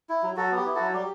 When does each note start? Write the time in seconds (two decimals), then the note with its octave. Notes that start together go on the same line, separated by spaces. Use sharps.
0.09 E4
0.23 F#3
0.37 F#3 F#4 A4
0.51 B3
0.57 G4
0.66 E4
0.75 F#3 F#4 A4
0.94 G3 G4